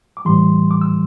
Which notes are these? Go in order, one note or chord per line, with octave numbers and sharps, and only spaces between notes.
D6
A2 E3 G3 C6
D6
E6